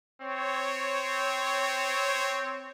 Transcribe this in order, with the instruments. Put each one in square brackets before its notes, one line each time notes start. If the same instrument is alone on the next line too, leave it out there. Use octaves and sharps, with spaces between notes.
[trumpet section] C4 C#5